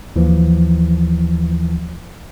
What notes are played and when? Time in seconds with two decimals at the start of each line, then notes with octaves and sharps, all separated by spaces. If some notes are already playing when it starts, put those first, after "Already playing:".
0.16 D#2 E3 F3